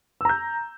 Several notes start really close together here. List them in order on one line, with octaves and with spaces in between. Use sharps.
E6 A#5 G6